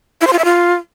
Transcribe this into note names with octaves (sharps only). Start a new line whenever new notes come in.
E4
C5
F4
E5
F4